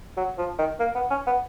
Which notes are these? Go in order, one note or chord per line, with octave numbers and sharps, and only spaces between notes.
F#3
F3
D#3
A#3
B3
C#4
B3